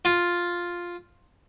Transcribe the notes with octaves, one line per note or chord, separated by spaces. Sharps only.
F4